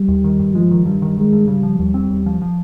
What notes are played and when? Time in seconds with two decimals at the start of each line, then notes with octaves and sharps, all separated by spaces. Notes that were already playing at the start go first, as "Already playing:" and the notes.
Already playing: G3
0.08 D#2
0.24 D#3
0.39 G2
0.55 F3 G#3
0.71 D#3
0.86 G2 G3
1.02 D#3
1.17 D#3 G#3
1.32 G2
1.48 C#3 G3
1.63 F3
1.79 D#2 G3
1.94 C4
2.10 D#2
2.26 F3
2.42 F3